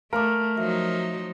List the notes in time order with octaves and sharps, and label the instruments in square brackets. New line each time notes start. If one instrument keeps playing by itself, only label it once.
[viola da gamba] A3 [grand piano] A#4 [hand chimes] F5 A5 D6
[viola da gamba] F3 F#3 D#4 [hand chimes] E5